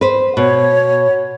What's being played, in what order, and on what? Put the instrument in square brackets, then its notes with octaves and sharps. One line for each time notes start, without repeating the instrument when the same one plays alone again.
[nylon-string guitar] B4 C5
[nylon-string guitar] B2 [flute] C#5